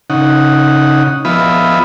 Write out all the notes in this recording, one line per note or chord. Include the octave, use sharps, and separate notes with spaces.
C#3 D#4 F#5
F3 B3 F4 D#5 E5 B5